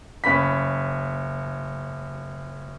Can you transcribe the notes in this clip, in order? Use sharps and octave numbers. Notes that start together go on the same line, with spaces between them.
F#1 C#4 B5 B6